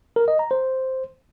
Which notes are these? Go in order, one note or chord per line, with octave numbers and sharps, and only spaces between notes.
A#4
D#5
A#5
C5